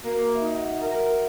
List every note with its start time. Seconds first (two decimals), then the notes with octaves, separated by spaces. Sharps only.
0.02 A#3 F#4
0.29 E5
0.41 D#4
0.55 F#5
0.80 A#4 E5